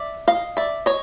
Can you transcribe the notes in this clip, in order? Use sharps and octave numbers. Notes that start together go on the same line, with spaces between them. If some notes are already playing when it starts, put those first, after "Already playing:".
Already playing: D5 E5
D#5 F5
D5 E5
C#5 D#5